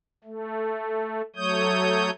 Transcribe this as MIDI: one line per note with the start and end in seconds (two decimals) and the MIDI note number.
0.24 1.22 57
1.36 2.10 54
1.36 2.10 57
1.36 2.10 73
1.36 2.10 87
1.36 2.10 91